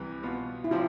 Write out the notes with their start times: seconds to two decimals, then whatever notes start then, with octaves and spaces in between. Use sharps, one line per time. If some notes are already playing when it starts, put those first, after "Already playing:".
Already playing: C2 C3 E3
0.23 B2 B3 F4
0.64 E4
0.71 C3 F3 C4 F4